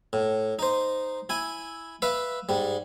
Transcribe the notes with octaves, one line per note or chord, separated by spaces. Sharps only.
A2
D#4 C5
E4 G#5
B4 E5 F5
G#2 G3